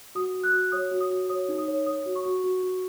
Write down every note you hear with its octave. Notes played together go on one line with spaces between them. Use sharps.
F#4 D#6
F#4
F#6
F#4
C#5 D#6
F#4
D#6
F#4
C#5 D#6
D#4
D#6
C#5
C#5 D#6
F#4
C#6
F#4
F#4
F#4